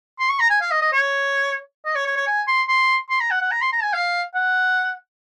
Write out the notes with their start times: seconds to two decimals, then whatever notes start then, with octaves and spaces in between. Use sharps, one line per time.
0.19 C6
0.29 C#6
0.40 A#5
0.50 G#5
0.61 F5
0.71 D#5
0.81 D#5
0.92 C#5
1.85 D#5
1.95 C#5
2.06 C#5
2.16 C#5
2.27 G#5
2.48 C6
2.68 C6
3.10 C6
3.20 A#5
3.31 F#5
3.41 F#5
3.51 A#5
3.62 C6
3.72 A#5
3.83 G#5
3.93 F5
4.35 F#5